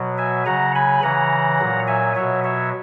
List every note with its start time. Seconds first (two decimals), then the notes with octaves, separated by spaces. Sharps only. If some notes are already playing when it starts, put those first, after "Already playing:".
Already playing: B2 F#3
0.18 E5 G#5
0.46 C#3 F#3 F#5 A#5
0.75 G#5 B5
1.03 C#3 E3 F#5 A#5
1.60 A#2 F#3
1.87 E5 G#5
2.16 B2 F#3 C#5 E5
2.44 C#5 E5